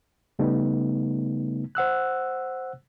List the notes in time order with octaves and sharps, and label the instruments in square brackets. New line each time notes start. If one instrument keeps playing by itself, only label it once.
[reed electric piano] C#3 G3 A3 B3 D#4
C5 F#5 E6 F#6